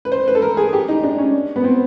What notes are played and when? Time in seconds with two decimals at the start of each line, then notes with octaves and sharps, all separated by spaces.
0.05 B4
0.12 C5
0.28 B4
0.35 A4
0.42 A#4
0.57 G#4
0.73 G4
0.89 D#4
1.03 D4
1.18 C#4
1.56 B3
1.64 C4